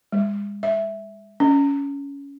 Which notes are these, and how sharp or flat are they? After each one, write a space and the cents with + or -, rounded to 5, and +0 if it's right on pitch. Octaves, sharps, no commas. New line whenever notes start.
G#3 -40
E5 -5
C#4 +20